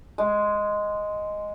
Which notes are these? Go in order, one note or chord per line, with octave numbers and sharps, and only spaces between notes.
G#3